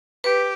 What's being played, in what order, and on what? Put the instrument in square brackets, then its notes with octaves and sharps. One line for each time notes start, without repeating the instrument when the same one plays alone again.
[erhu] G4 [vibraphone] B4